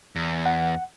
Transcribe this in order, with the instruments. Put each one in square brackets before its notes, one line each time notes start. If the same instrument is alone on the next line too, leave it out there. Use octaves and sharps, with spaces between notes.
[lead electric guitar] E2
[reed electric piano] F#5